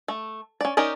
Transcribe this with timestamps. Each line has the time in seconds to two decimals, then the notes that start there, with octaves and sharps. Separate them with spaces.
0.08 A3
0.61 C#4 D5
0.77 C#4 D#4 G4 A#4 D5